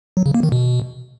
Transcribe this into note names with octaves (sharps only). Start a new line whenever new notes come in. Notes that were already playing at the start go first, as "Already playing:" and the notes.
F#3
C#3
A#3
D#3
B2